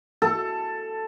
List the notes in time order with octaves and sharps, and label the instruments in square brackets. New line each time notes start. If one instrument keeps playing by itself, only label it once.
[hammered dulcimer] A4